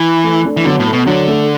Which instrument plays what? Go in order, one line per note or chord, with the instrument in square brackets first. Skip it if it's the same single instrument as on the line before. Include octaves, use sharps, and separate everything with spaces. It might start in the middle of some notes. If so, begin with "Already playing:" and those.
Already playing: [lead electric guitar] E3
[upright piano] A3
A3 D4
[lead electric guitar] E3
[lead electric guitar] D3 [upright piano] F#3 B3
[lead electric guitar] A2
[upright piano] A3
[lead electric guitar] B2
[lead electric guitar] D3 [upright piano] F#3
[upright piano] A3